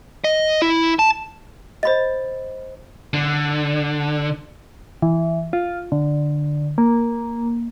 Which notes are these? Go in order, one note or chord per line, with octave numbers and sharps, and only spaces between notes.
D#5
E4
A5
C5 D#5 B5 A6
D3
E3
F4
D3
A#3